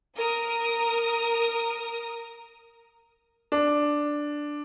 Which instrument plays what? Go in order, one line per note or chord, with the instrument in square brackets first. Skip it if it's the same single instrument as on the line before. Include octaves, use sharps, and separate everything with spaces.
[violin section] A#4 D#6
[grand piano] D4